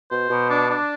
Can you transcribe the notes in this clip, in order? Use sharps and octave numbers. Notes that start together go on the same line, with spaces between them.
B2 C5
B2
D4
D4